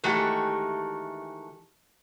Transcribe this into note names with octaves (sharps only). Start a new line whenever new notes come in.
D#3 E3 G#3 A3 F#4 G4